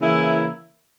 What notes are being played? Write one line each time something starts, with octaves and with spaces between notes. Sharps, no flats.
C#3 E3 A#3 E4